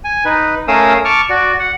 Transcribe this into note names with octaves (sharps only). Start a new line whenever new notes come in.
G#5
D#4 B4
A3 C#4 A#4 F5 D#6 E6
A5 C#6 D6 F6
F#4 D5
F#5